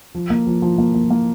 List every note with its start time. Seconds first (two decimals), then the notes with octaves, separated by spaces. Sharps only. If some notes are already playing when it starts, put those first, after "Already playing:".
0.15 F3
0.30 A#3
0.47 F3
0.62 F3
0.78 A#3
0.95 A#3
1.10 A#3